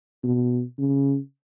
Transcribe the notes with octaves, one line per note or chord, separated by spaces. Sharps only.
B2
C#3